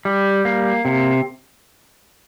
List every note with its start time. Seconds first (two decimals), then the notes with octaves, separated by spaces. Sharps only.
0.05 G3
0.45 A#3
0.85 C3